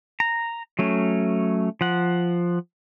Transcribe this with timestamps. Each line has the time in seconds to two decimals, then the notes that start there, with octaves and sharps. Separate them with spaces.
0.20 A#5
0.79 F#3 A3 C#4
1.81 F3 F#5